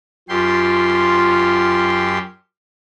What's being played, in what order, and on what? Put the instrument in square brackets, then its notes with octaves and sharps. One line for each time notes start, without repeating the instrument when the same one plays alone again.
[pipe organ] F#2 G4 C6 [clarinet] F4